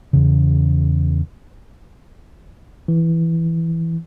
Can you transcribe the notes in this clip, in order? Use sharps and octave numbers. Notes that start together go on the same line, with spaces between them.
E2 C#3
E3